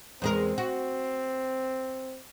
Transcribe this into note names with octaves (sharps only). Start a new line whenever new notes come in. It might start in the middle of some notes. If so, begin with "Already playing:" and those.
E2 G#3 C4 A#4
F#4